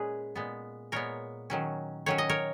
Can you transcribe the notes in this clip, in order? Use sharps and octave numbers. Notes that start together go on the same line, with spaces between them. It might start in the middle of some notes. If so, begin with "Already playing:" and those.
Already playing: A#2 G#3 C#4 G#4 B4
A#2 G#3 B3
A#2 G#3 B3 A#4 C#5
D#3 F#3 C#4
D#3 F#3 C#4 C#5
D#5
A#4 C#5